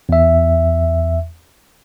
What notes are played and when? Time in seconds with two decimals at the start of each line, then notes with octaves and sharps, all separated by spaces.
0.09 E2 E5